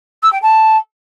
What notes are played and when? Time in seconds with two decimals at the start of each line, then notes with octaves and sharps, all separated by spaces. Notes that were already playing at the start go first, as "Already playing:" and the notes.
0.23 E6
0.32 G5
0.42 A5